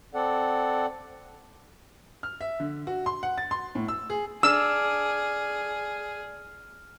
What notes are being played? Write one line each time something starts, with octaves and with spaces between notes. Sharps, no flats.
C4 A4 D5 F#5
F6
E5
D3
F#4
C6
F#5
A6
C6
A2
E6
G#4
D4 G#4 E6 F6